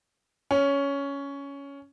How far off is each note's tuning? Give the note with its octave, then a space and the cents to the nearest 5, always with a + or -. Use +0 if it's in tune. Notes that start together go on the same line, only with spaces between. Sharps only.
C#4 +10